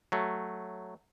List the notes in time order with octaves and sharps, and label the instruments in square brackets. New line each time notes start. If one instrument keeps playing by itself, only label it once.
[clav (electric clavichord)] F#3 A3